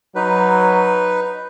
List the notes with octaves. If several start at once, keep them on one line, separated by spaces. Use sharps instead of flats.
F#3 D#4 B4